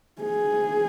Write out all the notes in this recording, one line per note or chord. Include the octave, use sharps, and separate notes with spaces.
G#4